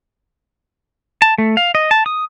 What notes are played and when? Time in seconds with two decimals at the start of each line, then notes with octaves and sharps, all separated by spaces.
1.22 A5
1.38 A3
1.57 F5
1.75 D#5
1.91 A5
2.06 D#6